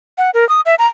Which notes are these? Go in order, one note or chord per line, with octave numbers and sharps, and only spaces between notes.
F#5
A#4
D#6
E5
A#5